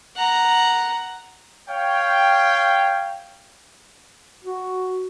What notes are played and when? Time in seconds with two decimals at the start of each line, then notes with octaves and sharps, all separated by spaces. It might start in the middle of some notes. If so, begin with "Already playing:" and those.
0.16 F#5 A#5
1.69 C#5 F5 G5
4.44 F#4